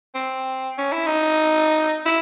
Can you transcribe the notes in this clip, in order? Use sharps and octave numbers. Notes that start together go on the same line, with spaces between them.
C4
C#4
E4
D#4
E4